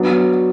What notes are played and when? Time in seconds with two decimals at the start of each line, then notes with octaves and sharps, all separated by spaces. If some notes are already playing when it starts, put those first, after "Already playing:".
Already playing: F#3 B3 D4